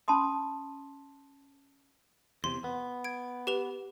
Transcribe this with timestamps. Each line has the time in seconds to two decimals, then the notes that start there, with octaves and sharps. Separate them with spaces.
0.08 C#4 A5 B5 C6 D#6
2.44 E2 C3 C6
2.64 B3
3.04 G#6 D7
3.47 G4 B4 F7